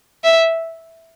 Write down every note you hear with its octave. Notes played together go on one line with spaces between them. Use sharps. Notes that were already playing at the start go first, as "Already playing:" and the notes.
E5